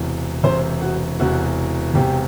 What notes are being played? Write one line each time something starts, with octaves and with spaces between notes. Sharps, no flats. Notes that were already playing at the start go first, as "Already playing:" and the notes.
Already playing: E1 E2 C3
E1 E2 C3 C5
F#4
E1 E2 C3 F#4
E1 E2 C3 G4